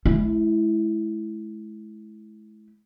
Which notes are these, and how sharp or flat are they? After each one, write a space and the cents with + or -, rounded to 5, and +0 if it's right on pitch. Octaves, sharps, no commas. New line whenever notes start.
G#3 +45 E4 +0